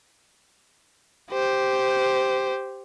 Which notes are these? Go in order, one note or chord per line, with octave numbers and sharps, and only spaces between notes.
G4 C5